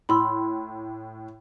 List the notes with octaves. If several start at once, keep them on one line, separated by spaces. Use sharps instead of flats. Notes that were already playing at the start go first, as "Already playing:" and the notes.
A2 B5 C6 E6